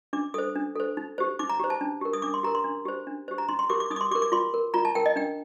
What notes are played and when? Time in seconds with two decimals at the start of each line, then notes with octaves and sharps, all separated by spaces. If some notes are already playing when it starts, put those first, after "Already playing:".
0.13 D4 D6
0.34 A4 C5 D#6
0.56 D4
0.76 A4 C5
0.97 D#4
1.18 G4 C5
1.39 D#4 D6
1.50 A#5
1.59 G4 C5
1.70 A5
1.81 D4
2.01 G4 A#4
2.13 D#6
2.22 D4 D6
2.34 C6
2.43 G4 A#4 A#5
2.55 C6
2.64 D4
2.85 G4 C5
3.07 D4
3.28 G4 C5
3.38 A#5
3.49 D#4 C6
3.59 C6
3.69 G4 A#4 D6
3.80 D6
3.90 D#4 D#6
3.96 D6
4.01 C6
4.11 G4 D6
4.15 A#4
4.22 D6
4.32 F4 C6
4.54 A#4
4.74 F4 A#5
4.85 A5
4.95 A#4 G5
5.06 D#5
5.16 D4 G5